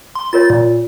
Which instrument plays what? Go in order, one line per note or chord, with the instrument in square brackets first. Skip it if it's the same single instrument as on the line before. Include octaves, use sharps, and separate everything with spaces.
[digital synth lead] C6
[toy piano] F4 A#4 C#5 [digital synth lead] A6
[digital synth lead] A#2